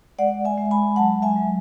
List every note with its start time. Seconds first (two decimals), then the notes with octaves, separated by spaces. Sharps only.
0.19 G#3 D5 F#5
0.45 E5 G#5
0.58 G#3
0.71 G#5 B5
0.96 F#3 F#5 A5
1.22 E5 G#5
1.36 F#3